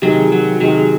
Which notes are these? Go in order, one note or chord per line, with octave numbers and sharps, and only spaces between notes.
C3 D#3 F#3 G#3
F#3
C3 D#3 F#3 G#3